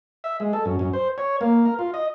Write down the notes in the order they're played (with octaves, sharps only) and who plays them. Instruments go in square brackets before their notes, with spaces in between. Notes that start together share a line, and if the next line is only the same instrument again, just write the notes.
[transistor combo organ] E5
G#3
A4
F#2
F#2
C5
C#5
A#3
A#4
F4
D#5